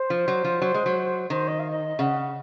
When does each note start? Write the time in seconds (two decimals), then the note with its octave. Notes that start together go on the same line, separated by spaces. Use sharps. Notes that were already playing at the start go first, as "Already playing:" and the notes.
Already playing: C5
0.10 F3
0.28 F#3
0.44 F3
0.62 F#3
0.74 G#3
0.86 F#3
1.30 D#3 C5
1.47 D#5
1.59 F5
1.70 D#5
1.99 C#3 F#5